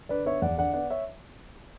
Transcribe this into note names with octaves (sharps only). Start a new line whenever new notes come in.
D3 B4 D5
B3 C#5 E5
E2 D5 F#5
D3 D5 F#5
B3 D5 F#5
C#5 E5